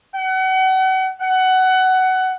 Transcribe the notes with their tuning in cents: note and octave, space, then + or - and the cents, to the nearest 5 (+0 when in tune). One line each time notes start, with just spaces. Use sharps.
F#5 +35
F#5 +15